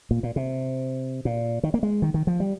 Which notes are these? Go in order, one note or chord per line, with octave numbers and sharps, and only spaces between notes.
A#2
A#2
C3
A#2
D#3
A#3
G#3
D#3
D#3
F3
G3